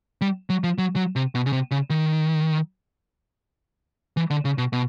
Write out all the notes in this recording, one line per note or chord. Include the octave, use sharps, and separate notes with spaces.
G3
F#3
F3
F#3
F#3
C3
B2
C#3
C3
C#3
D#3
E3
D3
C#3
B2
B2